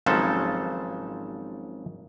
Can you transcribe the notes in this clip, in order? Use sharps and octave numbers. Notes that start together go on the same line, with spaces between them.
G#1 C#3 F3 F#3 A4 C5